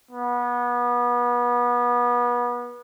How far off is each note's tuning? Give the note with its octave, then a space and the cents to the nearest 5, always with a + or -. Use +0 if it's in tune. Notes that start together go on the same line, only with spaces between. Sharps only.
B3 -30